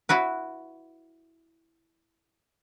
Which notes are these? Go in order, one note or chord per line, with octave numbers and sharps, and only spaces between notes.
E4 F#4 B4